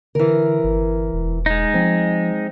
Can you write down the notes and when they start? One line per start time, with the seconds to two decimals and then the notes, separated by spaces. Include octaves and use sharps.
0.15 D3 E3 A#4
0.64 G1
1.12 E1
1.46 G#3 D#4
1.74 F3 C4